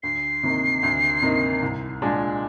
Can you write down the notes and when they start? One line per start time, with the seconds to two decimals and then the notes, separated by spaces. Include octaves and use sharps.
0.03 D2 C7
0.43 C3 D#3 A#3 D#4
0.83 D2
1.22 C3 D#3 A#3 D#4
1.62 C2
2.02 A#2 G#3 D4